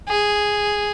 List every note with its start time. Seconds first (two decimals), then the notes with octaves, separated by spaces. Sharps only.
0.09 G#4